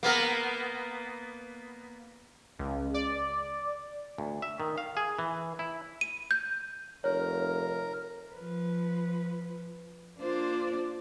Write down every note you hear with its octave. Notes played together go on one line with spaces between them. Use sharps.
A#3 B3 A#4
C#2
D5
D2
E5
D#3
F5
G#4
E3
E4
D#7
G6
F1 A#4 C#5
F3 B4
A#3 D4 F4 C5 D5